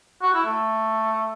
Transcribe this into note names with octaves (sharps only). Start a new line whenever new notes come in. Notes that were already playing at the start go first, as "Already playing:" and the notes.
F#4
E4
A3